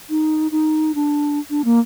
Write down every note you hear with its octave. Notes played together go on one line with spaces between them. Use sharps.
D#4
D#4
D4
D4
A#3